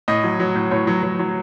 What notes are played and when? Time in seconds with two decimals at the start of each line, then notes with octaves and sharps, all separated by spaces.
0.08 A2 D#5
0.24 F#3
0.40 F#3
0.55 A2
0.71 A2 C#5
0.87 F#3
1.03 F#3
1.19 F#3